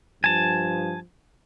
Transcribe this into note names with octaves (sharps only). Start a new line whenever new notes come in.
G2 F3 G#5 A5